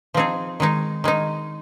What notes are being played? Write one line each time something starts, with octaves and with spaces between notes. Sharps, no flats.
F3 C4 D#4 G#4
D#3 G#3 D#4
D#3 G#3 D#4